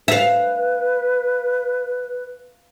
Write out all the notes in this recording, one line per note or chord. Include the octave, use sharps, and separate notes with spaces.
B4 E5 F5